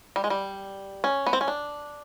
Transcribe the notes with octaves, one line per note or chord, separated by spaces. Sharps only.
G3
G#3
G3
C#4
B3
C4
C#4
D4